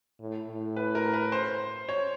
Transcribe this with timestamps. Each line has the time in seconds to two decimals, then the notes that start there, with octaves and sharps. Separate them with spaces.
0.20 A2
0.48 A2
0.76 B4
0.95 A#4
1.14 B4
1.32 C5
1.89 C#5